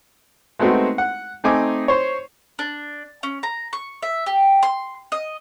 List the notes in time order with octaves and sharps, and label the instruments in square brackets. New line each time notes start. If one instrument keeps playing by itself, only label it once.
[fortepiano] G#3 A3 B3 C4 D#4 F#4
F#5
A3 C4 D#4 G#5 D6
C5 C#5
[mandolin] D4
C#4
A#5
C#6
E5
G4
C6
D#5